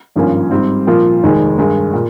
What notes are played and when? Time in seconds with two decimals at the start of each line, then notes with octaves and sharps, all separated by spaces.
0.16 G#1 G2 F3 A#3 C#4
0.51 G#2 G3 C4
0.87 A#2 F3 A#3 F4
1.23 F1 D#2 D#3 G#3
1.58 G2 D#3 G#3 D#4
1.94 A#2